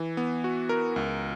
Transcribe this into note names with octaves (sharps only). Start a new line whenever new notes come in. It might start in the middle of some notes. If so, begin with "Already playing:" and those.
Already playing: E3
B3
F#4
A#4
C#2